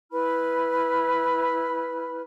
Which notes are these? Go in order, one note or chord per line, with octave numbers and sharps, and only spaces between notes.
E4 B4 B5 F6